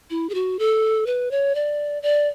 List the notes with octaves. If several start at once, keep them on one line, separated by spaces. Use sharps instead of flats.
E4
G#4
F#4
A4
B4
C#5
D5
D5